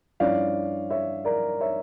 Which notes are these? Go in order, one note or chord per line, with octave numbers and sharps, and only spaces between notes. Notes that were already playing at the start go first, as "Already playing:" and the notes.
G2 F3 C#4 E4 D5 F5
C#5 E5
A#4 D5
C#5 E5